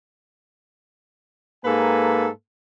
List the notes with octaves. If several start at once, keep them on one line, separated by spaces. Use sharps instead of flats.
G#2 A#3 A4 B4 G#5